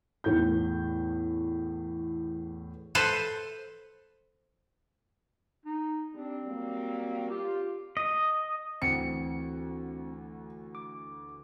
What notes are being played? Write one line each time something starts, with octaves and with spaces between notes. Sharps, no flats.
E2 A2 G6
A4 B4 C5
D#4
G3 C4 D4
F#3 G3 A#3
F4 G4
D#5
D2 E3 C4 F#5 C#7
D6